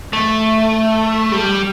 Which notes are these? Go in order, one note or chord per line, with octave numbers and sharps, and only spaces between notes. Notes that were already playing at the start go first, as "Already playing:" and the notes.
A3
G3